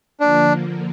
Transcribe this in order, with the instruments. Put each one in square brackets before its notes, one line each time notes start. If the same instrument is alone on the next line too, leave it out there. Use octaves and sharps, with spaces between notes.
[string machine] D3 F3 A#3 [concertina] D4